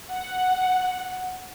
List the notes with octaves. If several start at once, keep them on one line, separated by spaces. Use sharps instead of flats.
F#5